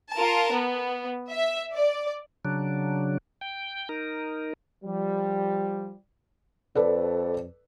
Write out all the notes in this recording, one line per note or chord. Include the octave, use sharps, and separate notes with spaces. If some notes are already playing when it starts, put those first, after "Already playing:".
F4 A#4 A5
B3
E5
D5
C#3 F#3 D4
G5
D#4 A#4
F3 G3
F2 A4 B4 D5